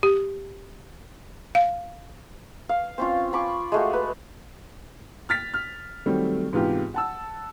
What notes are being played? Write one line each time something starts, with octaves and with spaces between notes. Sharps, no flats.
G4
F5
F5
C4 C#4 F4
G#5 B5 C#6 D6
G#3 A3 F#4
B4
F6 A6 B6
F6
D#3 F#3 G3 A3 C4
G#2 C3 E3 B3 F4 G4
F#5 A5 E6